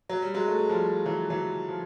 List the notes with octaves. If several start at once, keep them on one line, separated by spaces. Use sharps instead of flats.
F#3
G3
F#3 G#3
A3
G#3
F3 G3
E3 F#3
E3 F#3
F3